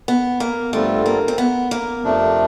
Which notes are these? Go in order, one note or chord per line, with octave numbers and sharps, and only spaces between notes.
B3
A#3
G2 D3 G3 A3 C4 F4
A#3
C4
B3
A#3
F2 C3 F3 A3 D4